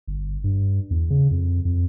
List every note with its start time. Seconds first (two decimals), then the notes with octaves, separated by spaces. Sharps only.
0.07 G1
0.44 G2
0.91 E2
1.10 C#3
1.31 F2
1.65 F2